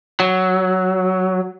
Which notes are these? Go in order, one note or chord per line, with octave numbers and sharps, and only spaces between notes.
F#3